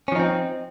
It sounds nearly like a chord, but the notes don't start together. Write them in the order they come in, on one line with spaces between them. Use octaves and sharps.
C#4 F3 D#4 C4